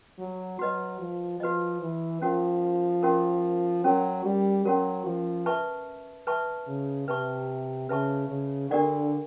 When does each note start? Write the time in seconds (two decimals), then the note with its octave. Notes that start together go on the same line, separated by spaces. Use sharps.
0.19 F#3
0.59 F#3 F#4 B4 D#5
1.00 F3
1.40 F3 F#4 B4 D#5
1.82 E3
2.22 F3 C#4 F#4 A#4
3.03 C#4 F#4 A#4
3.84 F#3 C#4 F#4 A#4
4.25 G3
4.64 F#3 C#4 F#4 A#4
5.06 F3
5.46 B4 E5 A5 C#6
6.27 B4 E5 A5 C#6
6.67 C#3
7.08 C3 B4 E5 A5 C#6
7.89 C#3 B4 E5 A5 C#6
8.29 C#3
8.70 D3 D4 G4 A#4 D5 F#5